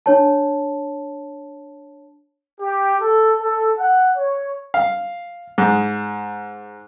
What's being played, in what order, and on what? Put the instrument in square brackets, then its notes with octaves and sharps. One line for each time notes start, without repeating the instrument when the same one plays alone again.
[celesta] D4 C#5 A5
[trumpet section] G4
A4
A4
F#5
C#5
[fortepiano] F5
G#2